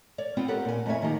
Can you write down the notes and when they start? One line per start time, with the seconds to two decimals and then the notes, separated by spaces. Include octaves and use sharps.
0.18 C#5 D5
0.37 B3 C4 F4 F#5 G5
0.48 G4 A4 A#4 C#5 F#5
0.65 A#2 G#5
0.86 F2 A2 C#4 C#5 E5 G#5
1.02 D#3 F3 A#3 G4